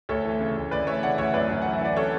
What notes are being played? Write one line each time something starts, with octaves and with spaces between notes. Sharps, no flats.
D2 A4 C#5
E3
C#3
D2
D2 B4 D5
E3 C#5 E5
C#3 D5 F#5
D2 C#5 E5
F#2 B4 D5
F#2
E3 F#5
E5
E3 D5
A4 C#5